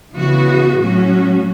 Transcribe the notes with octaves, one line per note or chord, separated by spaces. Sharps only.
C#3 E3 B3 F#4
A2 F#3 C#4 F#4